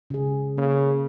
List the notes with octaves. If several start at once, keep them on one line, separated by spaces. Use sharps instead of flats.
C#3 G#4
C#3 A#3